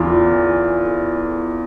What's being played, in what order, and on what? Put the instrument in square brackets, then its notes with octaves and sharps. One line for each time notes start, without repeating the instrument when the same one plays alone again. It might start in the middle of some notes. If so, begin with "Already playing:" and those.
Already playing: [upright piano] E2 E3 F4